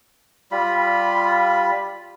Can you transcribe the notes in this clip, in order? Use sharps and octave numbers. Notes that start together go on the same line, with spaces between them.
G3 F4 B5